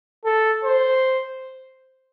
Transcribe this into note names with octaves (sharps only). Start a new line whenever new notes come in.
A4
C5